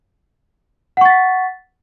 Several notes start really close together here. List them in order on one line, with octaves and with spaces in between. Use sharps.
F#5 C#6 A6 B6